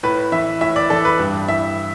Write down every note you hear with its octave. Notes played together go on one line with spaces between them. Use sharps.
A2 B4
E3 E5
A2 E5
D5
E3 A4
B4
G2
E3 E5